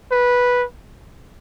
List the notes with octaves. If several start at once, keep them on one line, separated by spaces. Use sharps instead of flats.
B4